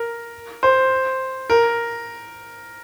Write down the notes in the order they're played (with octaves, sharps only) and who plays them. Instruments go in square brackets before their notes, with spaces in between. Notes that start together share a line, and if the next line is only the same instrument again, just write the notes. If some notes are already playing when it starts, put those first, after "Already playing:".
Already playing: [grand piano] A#4
C5
A#4